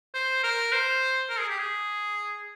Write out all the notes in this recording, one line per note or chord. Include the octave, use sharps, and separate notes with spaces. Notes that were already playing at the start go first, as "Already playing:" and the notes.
C5
A#4
C5
A#4
G#4
G4
G#4